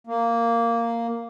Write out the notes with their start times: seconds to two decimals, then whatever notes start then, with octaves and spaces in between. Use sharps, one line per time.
0.07 A#3